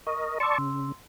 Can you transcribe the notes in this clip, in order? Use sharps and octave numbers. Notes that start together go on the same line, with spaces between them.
A#4 D#5 C#6
D5 A5 C6 C#6 E6
C#3